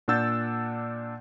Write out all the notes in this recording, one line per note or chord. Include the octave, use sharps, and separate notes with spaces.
A#2 D4 F#5 E6 G6 A6